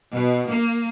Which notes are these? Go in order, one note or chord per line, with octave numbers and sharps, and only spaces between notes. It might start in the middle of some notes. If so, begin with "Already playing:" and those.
B2
A#3